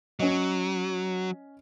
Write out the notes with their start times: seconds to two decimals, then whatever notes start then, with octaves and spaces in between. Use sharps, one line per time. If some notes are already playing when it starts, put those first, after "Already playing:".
0.20 F#3 C#4 D#5